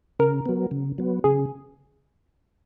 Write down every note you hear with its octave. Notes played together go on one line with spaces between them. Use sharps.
C#3 A#4
F#3 B3
C#3
F#3 B3
C#3 G#4